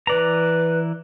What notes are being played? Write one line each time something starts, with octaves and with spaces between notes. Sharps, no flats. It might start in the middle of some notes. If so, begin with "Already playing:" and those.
E3 B4 D5 A#5